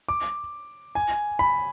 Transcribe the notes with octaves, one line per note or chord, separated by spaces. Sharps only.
D6
G#5
B5